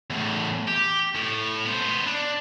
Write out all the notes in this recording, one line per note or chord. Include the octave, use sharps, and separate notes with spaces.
E2 A2
G4
A2
B3 C5
D4